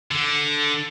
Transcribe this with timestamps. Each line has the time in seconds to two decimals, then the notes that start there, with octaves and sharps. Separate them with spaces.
0.11 D3